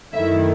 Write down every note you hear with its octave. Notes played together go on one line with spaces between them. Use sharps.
F#2 D#3 A3 E4 E5